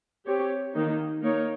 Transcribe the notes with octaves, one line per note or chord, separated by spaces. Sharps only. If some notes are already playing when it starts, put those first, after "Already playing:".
C4 G4 C#5
D#3 A#3 D#4
A#3 D#4 A#4 C#5